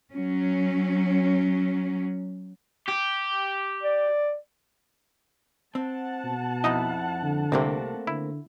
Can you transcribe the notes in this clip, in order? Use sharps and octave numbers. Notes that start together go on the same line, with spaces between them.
F#3 C#4
G4
D5
C4 F#5 A5
B2
F2 D#4 E4 D#5
D3
C2 C3 A3 A#3 C4
D3 E4